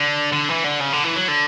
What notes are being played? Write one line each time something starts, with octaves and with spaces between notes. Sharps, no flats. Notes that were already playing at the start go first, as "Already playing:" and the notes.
Already playing: D3
D3
E3
D3
C#3
D3
E3
F#3
D3